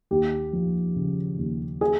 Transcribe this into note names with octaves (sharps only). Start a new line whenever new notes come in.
D#2 G4
F3
C#3
D#2
G#4